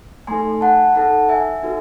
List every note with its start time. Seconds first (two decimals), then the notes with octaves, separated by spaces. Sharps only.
0.27 A3 D#4 A4 G#5 C6
0.61 F#5 A5
0.95 D#4 A4 F#5 A5
1.29 E5 G#5
1.63 D#4 F#4 A4